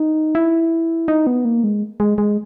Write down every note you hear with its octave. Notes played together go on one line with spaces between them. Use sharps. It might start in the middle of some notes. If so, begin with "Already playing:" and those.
Already playing: D#4
E4
D#4
B3
A#3
G#3
G#3
G#3